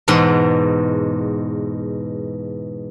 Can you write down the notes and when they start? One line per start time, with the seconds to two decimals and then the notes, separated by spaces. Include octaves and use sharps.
0.08 E2 G#2 B2 F#5 C6